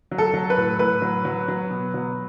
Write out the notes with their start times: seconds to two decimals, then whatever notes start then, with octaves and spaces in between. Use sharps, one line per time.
0.12 F#3
0.18 A4
0.34 F#3
0.50 B4
0.58 A2
0.79 A2 B4
1.02 F#3
1.25 F#3
1.48 F#3
1.70 B2
1.94 F#3